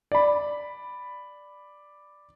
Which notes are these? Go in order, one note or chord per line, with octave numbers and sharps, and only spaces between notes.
D5 B5